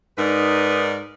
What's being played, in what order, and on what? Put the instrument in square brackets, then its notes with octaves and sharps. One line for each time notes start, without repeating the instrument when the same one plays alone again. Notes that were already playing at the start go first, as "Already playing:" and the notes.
[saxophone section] G#2 D#4 A#4 B4 D5